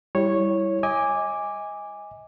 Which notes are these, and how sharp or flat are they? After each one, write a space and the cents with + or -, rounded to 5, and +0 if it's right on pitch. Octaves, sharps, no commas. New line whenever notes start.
G3 +0 E4 +0 C#5 -10
D#5 +30 G#5 -15 D6 +0